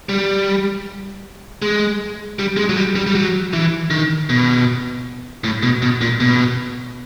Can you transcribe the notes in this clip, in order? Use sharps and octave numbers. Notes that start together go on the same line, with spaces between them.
G3
G#3
G3
G#3
F#3
G3
G3
G3
F#3
E3
D#3
B2
A2
B2
B2
A#2
B2